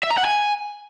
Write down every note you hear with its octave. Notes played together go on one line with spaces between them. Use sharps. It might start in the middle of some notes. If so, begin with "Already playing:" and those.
E5
A#5
F#5
G#5